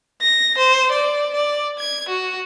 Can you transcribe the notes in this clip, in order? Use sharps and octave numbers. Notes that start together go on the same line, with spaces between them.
A#6
C5
D5
D5
G#6
F#4